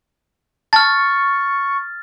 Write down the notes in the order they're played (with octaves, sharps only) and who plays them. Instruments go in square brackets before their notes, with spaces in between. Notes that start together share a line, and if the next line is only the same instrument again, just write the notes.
[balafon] A5 [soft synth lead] C#6 [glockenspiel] F6 A6